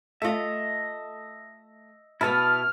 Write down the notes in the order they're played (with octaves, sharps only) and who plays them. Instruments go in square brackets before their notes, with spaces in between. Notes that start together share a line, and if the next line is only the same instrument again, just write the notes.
[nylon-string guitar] A3 F4 [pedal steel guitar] D#5 E5
[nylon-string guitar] B2 B3 [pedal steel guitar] E4 A5 D#6 [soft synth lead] F6